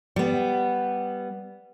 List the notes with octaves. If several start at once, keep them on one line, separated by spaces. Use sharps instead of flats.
G3 B3